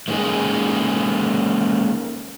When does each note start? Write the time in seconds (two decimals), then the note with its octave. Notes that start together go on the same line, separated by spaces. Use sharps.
0.08 G#3 A#3 C#4 D#4 E4 G#4